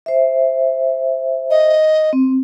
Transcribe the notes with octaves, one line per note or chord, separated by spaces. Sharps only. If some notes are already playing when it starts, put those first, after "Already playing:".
C5 E5
D#5
C4